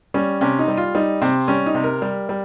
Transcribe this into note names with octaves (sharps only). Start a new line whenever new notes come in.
G3 C#4
C3 C#4
D#4
G3
F4
G3 D#4
C3 C4
G3 C#4
D#4
C3
A#4
G3
G3